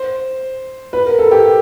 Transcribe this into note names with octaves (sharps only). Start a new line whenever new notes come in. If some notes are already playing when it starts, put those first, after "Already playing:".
Already playing: C5
B4
A#4
A4
G4